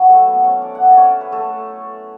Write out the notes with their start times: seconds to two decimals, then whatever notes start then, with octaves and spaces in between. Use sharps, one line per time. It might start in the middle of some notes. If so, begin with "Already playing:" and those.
Already playing: F#3 E4 F#4
0.09 A3 A4
0.26 B3 B4
0.43 C#4 C#5
0.62 D4 D5
0.75 F#5
0.82 E5
0.90 D5
0.97 C#4 C#5
1.21 B4
1.32 A3 A4